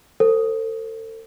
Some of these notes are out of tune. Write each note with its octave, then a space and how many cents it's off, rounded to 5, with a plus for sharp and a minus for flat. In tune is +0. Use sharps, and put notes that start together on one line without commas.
A4 +35 C5 +0